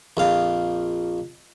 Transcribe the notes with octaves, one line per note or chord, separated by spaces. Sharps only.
A#1 F2 F5